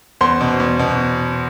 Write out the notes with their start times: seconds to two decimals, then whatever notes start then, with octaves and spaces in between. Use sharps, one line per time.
0.21 E2 C5 C6
0.41 B2
0.60 E2
0.79 B2